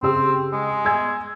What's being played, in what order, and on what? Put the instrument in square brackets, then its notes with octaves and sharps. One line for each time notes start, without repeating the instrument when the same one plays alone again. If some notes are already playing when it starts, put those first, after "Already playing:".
[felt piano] C#3 G4 E6 [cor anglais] C4
[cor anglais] G#3
[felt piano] G#5 E6 G#6